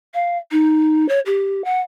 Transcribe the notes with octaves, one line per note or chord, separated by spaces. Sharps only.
F5
D#4
C#5
G4
F#5